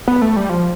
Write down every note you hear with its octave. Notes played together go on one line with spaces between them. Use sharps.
B3
A3
G3
F3